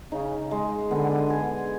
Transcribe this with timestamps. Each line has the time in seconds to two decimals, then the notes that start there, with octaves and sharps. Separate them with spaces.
0.11 C#3 D#4
0.51 G#3
0.91 D3 B3
1.30 G#4